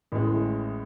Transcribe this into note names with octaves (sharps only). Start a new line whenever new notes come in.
A1 A2 G#3